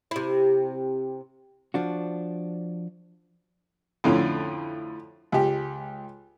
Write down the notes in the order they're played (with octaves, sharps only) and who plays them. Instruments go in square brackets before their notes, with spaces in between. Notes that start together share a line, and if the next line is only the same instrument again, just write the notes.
[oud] C3 E4
[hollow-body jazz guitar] F3 D4 F#4
[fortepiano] F2 A2 D3 C#4
C#2 G4